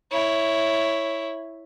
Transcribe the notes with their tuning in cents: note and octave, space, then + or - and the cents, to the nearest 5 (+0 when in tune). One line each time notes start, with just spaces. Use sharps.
E4 +0 C#5 +0